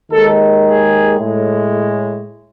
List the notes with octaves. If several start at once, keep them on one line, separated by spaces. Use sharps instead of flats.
D#2 D#3 G#3 A4
G#4
A2 G#3